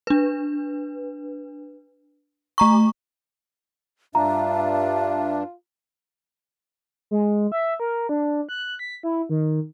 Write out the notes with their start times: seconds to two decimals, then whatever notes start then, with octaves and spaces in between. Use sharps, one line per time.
0.07 D4 B4
2.58 A3 A#5 C#6
4.15 G2 D4 F4 E5 A#5
7.11 G#3
7.52 E5
7.80 A#4
8.09 D4
8.49 F#6
8.79 B6
9.03 E4
9.29 D#3